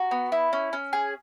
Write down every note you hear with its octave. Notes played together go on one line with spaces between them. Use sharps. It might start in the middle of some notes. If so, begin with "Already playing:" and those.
Already playing: F#4 A#5
B3
E4
C#4
C#4
G#4